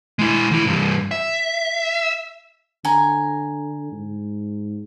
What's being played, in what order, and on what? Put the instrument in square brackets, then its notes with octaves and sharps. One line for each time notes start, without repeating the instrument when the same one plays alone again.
[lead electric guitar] G#3 E4
D3 E4
C2 G2
E5
[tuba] D3 [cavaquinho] G#5 A#5
[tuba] G#2